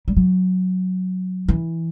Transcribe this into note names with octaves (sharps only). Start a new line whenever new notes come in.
G3
F#3
E3